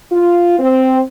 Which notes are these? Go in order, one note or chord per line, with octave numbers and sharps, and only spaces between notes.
F4
C4